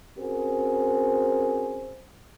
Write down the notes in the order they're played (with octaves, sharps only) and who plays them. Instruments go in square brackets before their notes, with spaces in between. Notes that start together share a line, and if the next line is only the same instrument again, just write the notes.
[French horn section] C4 C#4 F#4 G#4 A#4 C5